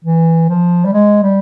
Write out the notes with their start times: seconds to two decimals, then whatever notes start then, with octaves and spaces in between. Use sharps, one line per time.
0.05 E3
0.49 F3
0.85 G3
0.93 G#3
1.23 G3